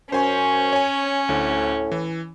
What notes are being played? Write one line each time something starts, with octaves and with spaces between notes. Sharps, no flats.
F#2 C#4 C5 G#5 C#6
C#5 G#5
D2 A2 D3
E3